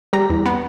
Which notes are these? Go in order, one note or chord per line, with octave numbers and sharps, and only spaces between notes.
G3 A#5
E2
B3